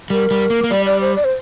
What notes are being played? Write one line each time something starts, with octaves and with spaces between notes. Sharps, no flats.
G3 A#4
G3
A#3
A#3
G3 D5
D5
C5
D5
C5